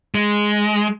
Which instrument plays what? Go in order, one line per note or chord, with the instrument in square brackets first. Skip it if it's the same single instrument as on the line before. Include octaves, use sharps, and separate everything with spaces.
[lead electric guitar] G#3